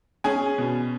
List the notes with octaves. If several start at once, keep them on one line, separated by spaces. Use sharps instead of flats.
C#4 G#4 G#5
B2